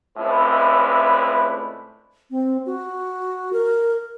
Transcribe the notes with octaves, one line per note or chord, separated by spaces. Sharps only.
C#2 A2 C4 D4 E4 B4
C4
F#4
A#4